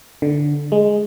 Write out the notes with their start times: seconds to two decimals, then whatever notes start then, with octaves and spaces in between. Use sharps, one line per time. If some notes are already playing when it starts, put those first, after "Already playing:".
0.22 D3
0.72 G#3